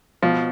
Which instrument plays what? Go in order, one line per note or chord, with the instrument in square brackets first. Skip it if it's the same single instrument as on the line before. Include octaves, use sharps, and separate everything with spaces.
[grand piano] B2 [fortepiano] F3